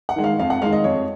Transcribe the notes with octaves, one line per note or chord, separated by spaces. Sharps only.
F#5
D#3 G#3
F5
F2 F5
F#5
D#3 G#3 F5
D#5
F2 C#5